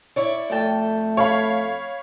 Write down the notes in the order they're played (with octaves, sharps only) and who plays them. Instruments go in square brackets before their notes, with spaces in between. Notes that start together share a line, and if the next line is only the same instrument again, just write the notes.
[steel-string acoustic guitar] E4 C#5 D5
[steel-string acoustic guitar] F2 G5 A5 [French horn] A3
[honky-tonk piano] C#5 F5 B5